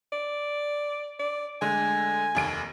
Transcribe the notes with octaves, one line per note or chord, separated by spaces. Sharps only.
D5
D5
D3 G#3 A3 G#5
F1 D#2 D7